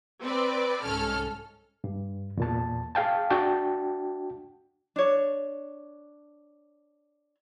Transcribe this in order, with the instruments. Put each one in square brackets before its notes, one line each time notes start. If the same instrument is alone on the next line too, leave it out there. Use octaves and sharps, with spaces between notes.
[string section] C4 B4 D5
C2 G#2 C#4 A4 F6
[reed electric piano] G2
E2 A#2 A5
G#4 F5 G5 A5
D4 F#4 G5 A5
[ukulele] D4 C#5